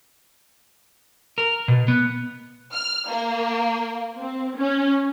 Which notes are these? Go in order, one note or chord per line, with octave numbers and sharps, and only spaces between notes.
A#4
B2
B3
F6
A#3
C4
C#4